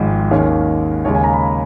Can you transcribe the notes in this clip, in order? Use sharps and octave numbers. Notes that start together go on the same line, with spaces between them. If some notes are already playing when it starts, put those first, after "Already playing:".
Already playing: G#1 G#2 F3
D#2 D#3 G#3 C#4 F5
D#2 C#3 G#3 C#5
G#5
A#5
B5